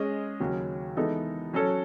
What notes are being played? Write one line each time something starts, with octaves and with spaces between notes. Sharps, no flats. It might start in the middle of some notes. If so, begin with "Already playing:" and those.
Already playing: G#3 C#4 G#4 D#5
D#2 C#3 F#3 C#4
E3 G#3 B3 D#4 A4
F#3 C#4 F#4 A4 C#5